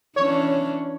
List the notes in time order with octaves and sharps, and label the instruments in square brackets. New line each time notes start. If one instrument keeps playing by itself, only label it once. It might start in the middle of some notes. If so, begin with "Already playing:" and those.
[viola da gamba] E3 C#4 D4 [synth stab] C#5